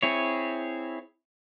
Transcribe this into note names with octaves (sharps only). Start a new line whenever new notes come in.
C4 E4 G#4 C#5